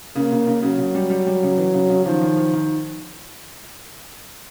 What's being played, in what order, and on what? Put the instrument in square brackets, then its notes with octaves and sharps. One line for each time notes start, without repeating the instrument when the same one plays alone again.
[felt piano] C#3 [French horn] A#3
[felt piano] C#3
C#3
[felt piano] C#3 [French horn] F#3
[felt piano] C#3
G3
G3
G3
C#3
E3
C#3
C#3
[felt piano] D#3 [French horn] F3
[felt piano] D#3
D#3
D#3